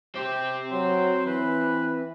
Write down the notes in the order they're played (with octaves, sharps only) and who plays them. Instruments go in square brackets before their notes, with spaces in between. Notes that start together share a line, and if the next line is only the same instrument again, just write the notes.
[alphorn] C3 [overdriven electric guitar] C4 [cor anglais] G4
[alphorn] F#3 [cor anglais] C5
[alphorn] E3 [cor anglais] B4